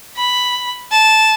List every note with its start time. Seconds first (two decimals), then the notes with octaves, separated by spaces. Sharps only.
0.16 B5
0.91 A5